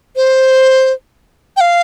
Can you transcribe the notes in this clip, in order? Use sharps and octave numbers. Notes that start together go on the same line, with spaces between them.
C5
G5
F5